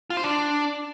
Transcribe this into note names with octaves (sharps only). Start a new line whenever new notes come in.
F4
C5
D4